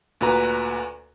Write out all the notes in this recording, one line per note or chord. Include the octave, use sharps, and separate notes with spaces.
D2 A#2 F#4 B4 A#5